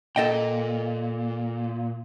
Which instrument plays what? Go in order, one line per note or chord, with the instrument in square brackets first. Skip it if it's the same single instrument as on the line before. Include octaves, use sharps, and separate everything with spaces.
[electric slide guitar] A#2 [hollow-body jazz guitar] A4 D#5 G5